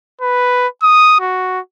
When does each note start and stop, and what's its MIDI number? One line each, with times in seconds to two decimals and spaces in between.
0.21 0.67 71
0.83 1.20 87
1.21 1.60 66